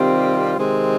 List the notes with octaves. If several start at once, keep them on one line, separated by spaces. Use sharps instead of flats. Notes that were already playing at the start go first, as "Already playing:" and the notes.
Already playing: C3 D#3 G3 C4 F4
C3 D#3 G#3 C4